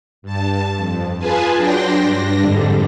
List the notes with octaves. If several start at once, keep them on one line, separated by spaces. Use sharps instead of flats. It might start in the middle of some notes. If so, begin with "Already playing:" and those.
G2 A5
F2
F4 G#4 B4 G#5 A5
F#3 D4 G5 C6 A#6
G2 D4 A#6
F2 G#2 D3 G3